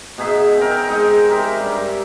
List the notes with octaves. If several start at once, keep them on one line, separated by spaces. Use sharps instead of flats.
B2 D#4 G#4 E5
C4 A#4
G#3 D#4
G4 A#4 E5
G2